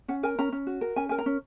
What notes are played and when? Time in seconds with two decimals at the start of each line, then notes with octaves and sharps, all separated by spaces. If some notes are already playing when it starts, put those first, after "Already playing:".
0.08 C#4 F#5
0.23 A#4 G#5
0.39 C#4 A#5
0.52 C#4
0.67 F#4
0.81 A#4
0.96 C#4 G#5
1.09 A#4 G#5
1.19 A#5
1.26 C#4